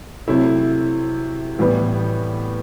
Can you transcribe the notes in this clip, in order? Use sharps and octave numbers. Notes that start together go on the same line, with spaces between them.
C3 F#3 A3 E4
A2 E3 G3 B3